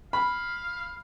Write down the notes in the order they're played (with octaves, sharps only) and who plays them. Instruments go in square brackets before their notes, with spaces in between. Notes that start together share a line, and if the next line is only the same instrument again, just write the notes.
[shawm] F5 [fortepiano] B5